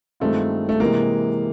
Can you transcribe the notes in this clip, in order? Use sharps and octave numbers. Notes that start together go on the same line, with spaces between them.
G2 D#3 G#3 A3 C4 F4
A3
C3 E3 G#3 A#3